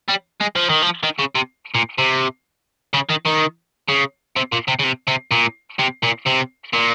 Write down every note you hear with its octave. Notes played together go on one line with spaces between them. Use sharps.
G3
G#3
F3
D#3
F3
D#3
C#3
C3
A#2
C3
C#3
D#3
D#3
C#3
C3
A#2
C3
C#3
C3
C3
A#2
C3
A#2
C3
A#2